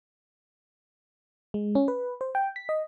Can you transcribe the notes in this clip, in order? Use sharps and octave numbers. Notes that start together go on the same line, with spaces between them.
G#3
C#4
B4
C5
G5
B6
D#5